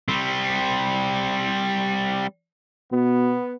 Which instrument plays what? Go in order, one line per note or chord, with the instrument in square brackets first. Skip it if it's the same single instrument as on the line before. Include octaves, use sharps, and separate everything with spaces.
[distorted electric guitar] G3 C4
[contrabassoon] B2 [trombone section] B3